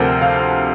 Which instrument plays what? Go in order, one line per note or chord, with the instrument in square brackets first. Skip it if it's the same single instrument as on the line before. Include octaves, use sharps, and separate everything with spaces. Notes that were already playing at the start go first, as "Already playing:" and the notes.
Already playing: [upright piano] D2 C3 F3 A4 A#4 C5
F5